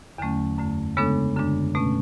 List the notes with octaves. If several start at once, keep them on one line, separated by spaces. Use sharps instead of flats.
E2 D3 F#3 A3 C#4
F#2 D3 A3
C#3 G#3 B3 D4 A4
F#2 D3 G#3 D4
B2 A3 C#4